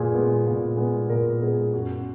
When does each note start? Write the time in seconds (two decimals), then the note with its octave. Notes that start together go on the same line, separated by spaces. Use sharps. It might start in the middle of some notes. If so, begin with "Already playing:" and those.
Already playing: A#2 G#3 B3 G#4
0.14 G#3 B3
0.46 A#2
0.77 G#3 B3
1.09 A#2 A#4
1.42 G#3 B3 G#4
1.74 F#2 F#4